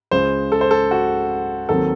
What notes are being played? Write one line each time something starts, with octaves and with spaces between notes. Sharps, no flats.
C#2 C#3 G#3 C5
A4
C5
A4
F#4
D#2 D#3 F#3 C4 A4